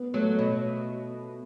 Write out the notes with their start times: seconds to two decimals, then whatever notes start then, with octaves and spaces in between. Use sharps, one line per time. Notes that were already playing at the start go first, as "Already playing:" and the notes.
Already playing: B3
0.14 F#3 A3
0.39 B2